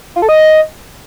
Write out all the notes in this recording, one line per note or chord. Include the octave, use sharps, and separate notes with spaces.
F4
A4
D#5